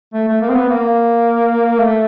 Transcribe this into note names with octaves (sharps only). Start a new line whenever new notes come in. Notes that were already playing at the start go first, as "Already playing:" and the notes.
A3
A3
A#3
C4
B3
A#3
A3